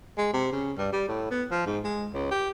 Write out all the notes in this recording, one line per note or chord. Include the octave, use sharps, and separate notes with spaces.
G#3
C3
C#3
G2
G3
A2
B3
F3
G#2
G#3
C#2
G4